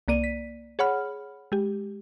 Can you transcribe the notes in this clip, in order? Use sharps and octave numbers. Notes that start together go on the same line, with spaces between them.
C2 A#3 D5 D#7
B6
G#4 C#5 F#5 B5 F6
G#3 G4